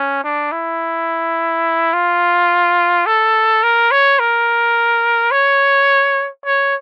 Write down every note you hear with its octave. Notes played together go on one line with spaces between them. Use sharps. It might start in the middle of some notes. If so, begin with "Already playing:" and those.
Already playing: C#4
D4
E4
F4
A4
A#4
C#5
A#4
C#5
C#5